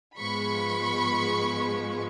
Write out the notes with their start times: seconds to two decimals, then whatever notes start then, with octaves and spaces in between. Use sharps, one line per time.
0.17 G#2 F3 G#3 B3 B5 C#6